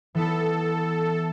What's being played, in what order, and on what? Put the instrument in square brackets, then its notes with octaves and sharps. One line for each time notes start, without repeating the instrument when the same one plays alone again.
[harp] E3 B3 E4 [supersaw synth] A4